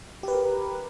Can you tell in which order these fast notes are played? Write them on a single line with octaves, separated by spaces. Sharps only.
G4 B4 A#4